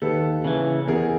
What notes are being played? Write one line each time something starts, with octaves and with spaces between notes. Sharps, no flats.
D#2 A4 B4
C#3 E3
E2 G#4 A#4